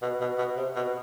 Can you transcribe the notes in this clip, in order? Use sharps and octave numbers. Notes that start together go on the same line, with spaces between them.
B2
B2
B2
C3
B2